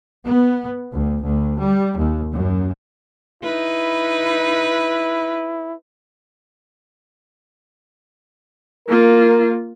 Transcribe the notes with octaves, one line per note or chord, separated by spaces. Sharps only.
B3
D2
D2
G3
D#2
F#2
D#4 E4 B4
A#3 F4 A#4